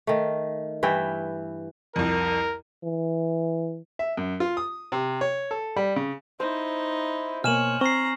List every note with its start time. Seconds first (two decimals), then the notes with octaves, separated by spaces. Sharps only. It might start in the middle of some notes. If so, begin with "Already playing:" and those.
0.07 D#3 A3
0.83 G2 E3 E5 G5
1.96 C2 F2 A#4
2.83 E3
3.99 E5
4.17 F#2
4.40 F4
4.57 D#6
4.92 C3
5.21 C#5
5.51 A4
5.76 G3
5.96 C#3
6.40 D#4 E4 C5
7.44 B2 A#3 C#5 G#5 F6 E7 F#7
7.81 C4 A#5 C#6 C7